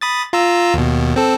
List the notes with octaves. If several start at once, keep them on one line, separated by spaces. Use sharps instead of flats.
B5 D#6 A6
F4 A#5 E6
D#2 B2
C4 A4